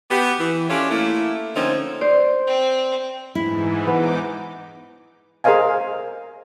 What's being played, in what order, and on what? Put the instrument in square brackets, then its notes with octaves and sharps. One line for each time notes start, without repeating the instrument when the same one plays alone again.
[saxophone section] B3 G4
E3
C#4 D4 F4 G4 A4 C#5
A3 A#3 E4
D3 F3 A#3 C4 C#4 D#4
[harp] C5 [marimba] D5
[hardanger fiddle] C4
[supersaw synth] G#2 E3 [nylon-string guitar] E4
[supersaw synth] E2 D#4 D6 [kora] B3
[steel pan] G#4 A#4 C5 D#5 F5 G#5